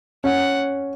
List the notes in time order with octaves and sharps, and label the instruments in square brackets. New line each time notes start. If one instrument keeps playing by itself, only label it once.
[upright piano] C#4 [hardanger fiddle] F#5